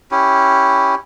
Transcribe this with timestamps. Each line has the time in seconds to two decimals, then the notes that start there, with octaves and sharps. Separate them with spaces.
0.11 C#4 E4 G4